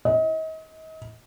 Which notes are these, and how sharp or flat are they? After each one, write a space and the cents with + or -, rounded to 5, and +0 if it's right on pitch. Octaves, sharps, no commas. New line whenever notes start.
D#5 +35